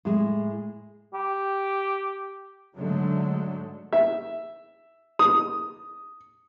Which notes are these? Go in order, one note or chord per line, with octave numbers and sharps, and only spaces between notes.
A2 G#3
G4
G#2 D3 F#3 G#3 A3
E5
D#6